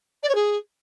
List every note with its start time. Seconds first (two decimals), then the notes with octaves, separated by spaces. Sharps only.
0.23 D5
0.29 C#5
0.35 G#4